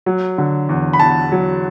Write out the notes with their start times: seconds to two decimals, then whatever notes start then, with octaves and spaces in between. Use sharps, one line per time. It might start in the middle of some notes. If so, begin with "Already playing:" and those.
0.06 F#3
0.38 D3
0.69 E2
0.93 B5
1.00 E2 A5
1.32 F#3